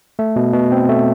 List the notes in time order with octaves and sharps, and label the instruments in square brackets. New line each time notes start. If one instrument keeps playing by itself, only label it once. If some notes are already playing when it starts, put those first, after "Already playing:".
[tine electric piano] A3
B2
B2
C4
A3